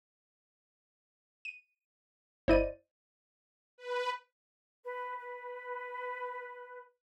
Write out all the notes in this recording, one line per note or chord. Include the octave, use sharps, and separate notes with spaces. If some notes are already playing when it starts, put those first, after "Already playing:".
D#7
G1 E4 C5 D5 D#5 D#7
B4
B4
B4